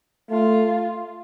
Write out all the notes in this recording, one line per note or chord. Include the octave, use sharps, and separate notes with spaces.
A3 F4